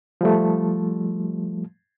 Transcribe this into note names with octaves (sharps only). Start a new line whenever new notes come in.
F3 G3 A3